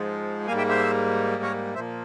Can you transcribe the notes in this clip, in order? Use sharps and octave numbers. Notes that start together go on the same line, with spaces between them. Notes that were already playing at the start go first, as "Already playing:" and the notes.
Already playing: G#2 F3 G#3
G#2 G3 A#3 F5 G#5
E5 G5
C5 E5
A#4 C#5
A#2 F3 A#3 C5 E5